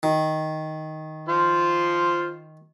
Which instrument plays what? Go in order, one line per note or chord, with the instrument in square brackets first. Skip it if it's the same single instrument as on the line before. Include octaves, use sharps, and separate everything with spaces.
[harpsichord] D#3
[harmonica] F4 C5